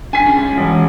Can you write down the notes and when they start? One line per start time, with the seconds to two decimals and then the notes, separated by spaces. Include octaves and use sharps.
0.13 D4 G#5 B6
0.26 C#4 F4 G#4
0.57 E1